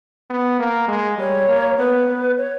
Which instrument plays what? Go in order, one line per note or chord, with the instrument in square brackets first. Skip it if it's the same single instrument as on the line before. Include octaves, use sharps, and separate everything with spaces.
[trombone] B3
A#3
G#3
[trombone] G3 [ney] C#5
[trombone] A#3
[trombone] B3 [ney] B4
[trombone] B3
[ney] C#5